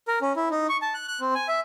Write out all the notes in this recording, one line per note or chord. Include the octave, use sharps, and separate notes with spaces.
A#4
C#4
E4
D#4
C#6
A5
F#6
F#6
C4
G#5
E5